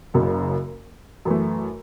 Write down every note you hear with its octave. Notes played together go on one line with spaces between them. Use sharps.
F#1 F#2 C#3
F#2 E3 A3